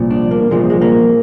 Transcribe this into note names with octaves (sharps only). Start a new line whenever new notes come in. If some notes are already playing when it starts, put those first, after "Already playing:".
Already playing: C2 A#2 F3
D4
A#3
C2 A#2 F3 G#3
G#3
A#3